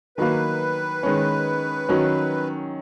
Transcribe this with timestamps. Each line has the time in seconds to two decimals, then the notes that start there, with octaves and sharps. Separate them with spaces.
0.17 D#3 F#3 A#3 B4
1.03 D#3 G#3 C#4
1.89 D#3 F#3 C#4